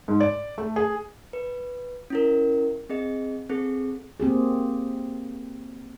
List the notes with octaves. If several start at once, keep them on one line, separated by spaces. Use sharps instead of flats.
G#2
D5
A3
G#4
B4
C#4 E4 A#4
C4 G#4 D#5
C4 G#4 A4
A#3 C4 G4 G#4